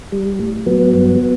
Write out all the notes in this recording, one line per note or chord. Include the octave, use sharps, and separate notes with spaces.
G3
A2
F#3 B3
G2